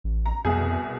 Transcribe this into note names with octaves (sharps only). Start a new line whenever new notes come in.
A1
A#5
C2 F2 B2 G#4